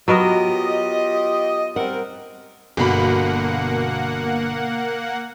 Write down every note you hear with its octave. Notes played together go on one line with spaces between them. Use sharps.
F#3 B3 F4 G4 A#4 D#5
G3 C4 A#4 F#5
G1 B2 A#3 F#5 B5